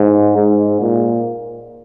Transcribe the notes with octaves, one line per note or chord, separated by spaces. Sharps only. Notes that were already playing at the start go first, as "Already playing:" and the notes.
Already playing: G#2
G#2
A#2